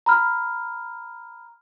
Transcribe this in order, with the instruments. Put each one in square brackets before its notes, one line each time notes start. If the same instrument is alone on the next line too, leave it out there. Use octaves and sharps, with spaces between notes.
[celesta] A#5 B5 F6